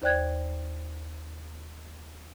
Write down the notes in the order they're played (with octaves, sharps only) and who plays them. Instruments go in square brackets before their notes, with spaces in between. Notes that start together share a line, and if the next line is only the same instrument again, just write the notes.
[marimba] D#2 C5 D5 G5 F#6 G#6